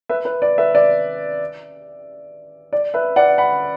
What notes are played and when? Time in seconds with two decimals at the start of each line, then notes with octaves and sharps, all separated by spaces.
0.09 B4 E5
0.25 B4
0.42 D5
0.58 B4 E5
0.75 D5
2.73 D5
2.94 B4 E5
3.16 D5 F#5
3.38 F#5 B5